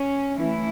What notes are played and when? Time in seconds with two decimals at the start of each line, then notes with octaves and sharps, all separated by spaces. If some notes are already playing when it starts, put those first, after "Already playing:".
Already playing: C#4
0.37 E3 A3 C#4 E4